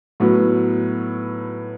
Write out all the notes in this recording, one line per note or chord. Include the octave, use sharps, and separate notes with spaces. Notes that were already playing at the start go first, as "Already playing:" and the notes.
A2 F#3 B3